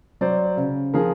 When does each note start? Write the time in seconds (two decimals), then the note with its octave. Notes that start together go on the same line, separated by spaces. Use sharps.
0.21 F#3 C5 D5
0.57 C#3
0.94 F3 G#4 A#4